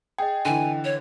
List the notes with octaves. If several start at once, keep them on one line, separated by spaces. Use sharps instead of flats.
G#4 D#5 G5
D3 E3 G#5
C#5